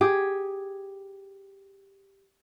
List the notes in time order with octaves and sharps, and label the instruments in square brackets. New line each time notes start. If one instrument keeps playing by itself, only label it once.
[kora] G4 G#4